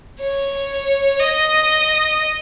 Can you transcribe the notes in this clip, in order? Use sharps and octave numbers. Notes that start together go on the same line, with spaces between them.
C#5
D#5